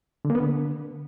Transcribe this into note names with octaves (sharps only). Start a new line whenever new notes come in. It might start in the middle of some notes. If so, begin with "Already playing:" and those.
D3
A#3
B3
D3